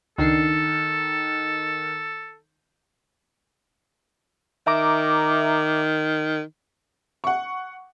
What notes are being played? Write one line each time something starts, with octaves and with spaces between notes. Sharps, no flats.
C#2 D#3 D4 A4 C7
D#3 E5 A#5 D6
F#5 C#6